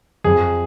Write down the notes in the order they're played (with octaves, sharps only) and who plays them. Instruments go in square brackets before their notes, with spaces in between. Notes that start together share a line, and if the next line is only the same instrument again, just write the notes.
[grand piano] F2 G#4